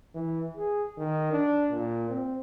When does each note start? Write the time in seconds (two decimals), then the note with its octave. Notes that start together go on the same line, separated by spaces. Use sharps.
0.15 E3
0.57 G#4
0.97 D#3
1.32 D4
1.71 A#2
2.09 C4